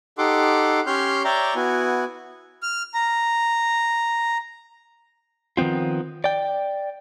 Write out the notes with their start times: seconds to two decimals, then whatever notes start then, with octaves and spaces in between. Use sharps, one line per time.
0.18 D#4 G4 A4 F#5 C6 D6
0.87 C#4 G4 C#5 C6 F6 G6
1.24 C#5 D5 E5 G5 A#5 D6
1.55 B3 E4 F#4 G#5
2.63 F6
2.94 A#5
5.57 D#3 F3 B3 C4 F4
6.24 D5 G5